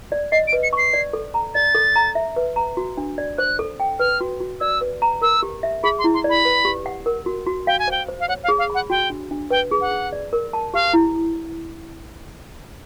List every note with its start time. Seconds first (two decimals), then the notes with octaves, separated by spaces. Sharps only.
0.12 D5
0.32 D#5 C7
0.48 D7
0.53 B4
0.63 C#7
0.73 C#6
0.78 C7
0.94 D5
1.13 A4
1.34 A#5
1.55 D5 A6
1.75 A4
1.96 A#5
2.15 E5
2.36 B4
2.56 A#5
2.77 F#4
2.97 D4
3.18 D5
3.38 C5 F#6
3.59 A4
3.80 G5
4.00 B4 F6
4.21 F#4
4.40 F#4
4.60 D5 E6
4.81 B4
5.02 A#5
5.22 A#4 E6
5.43 G4
5.63 E5
5.83 G#4 B5
5.99 C6
6.04 E4
6.14 C6
6.24 D5
6.29 B5
6.45 B4
6.65 G4
6.86 F#5
7.06 A#4
7.26 F#4
7.47 F#4
7.67 F5 G5
7.79 G#5
7.88 C5 G5
8.09 C5
8.20 F5
8.28 C#5 F#5
8.44 F5
8.48 G#4
8.59 F5
8.70 F#5 B5
8.90 F#4 G5
9.10 D4
9.31 D4
9.51 B4 G5
9.71 G#4
9.81 F#5
9.92 G#4
10.13 D5
10.33 A#4
10.53 A5
10.74 G4 F5
10.93 E4